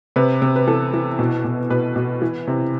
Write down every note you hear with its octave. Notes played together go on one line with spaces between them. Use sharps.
C3 B4
C3
B4
E3 A4
E3
B2
B2
B2 B4
B2
E3
C3